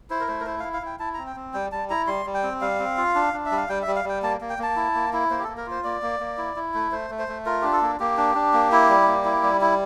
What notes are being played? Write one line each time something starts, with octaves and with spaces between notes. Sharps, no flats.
E4 C5
A#4
A3 C5
A#4
E4 C5
E4 F5
F5
E4 G5
E4 A5
C4 A#5
G5
C4
G3 G5
G3 A5
E4 A#5
G3 C6
G3
G5
C4
G3 F5
C4
F4
D4
D4
E5
G3
F5
G3 G5
E5
G3
F5
G3 G5
A#3 A5
A#3
G5
A#3 A5
E4
A#3
E4
A#3 C5
G4
A#3 A4
A#4
F4 C5
A#3 D5
A#3
A#3
E4
E4
A3
A3 C5
A3
C5
A3
F4 A#4
D4 G4
A4
A#3
A#3 G4
D4
D4
A#3
E4
G3
A#3
E4
G3
E4